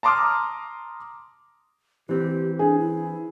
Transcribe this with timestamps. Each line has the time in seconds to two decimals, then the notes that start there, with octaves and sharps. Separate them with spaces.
0.03 A5 A#5 C6 D6 D#6 F6
2.09 E3 C4 G4
2.59 D4 G#4
2.80 E4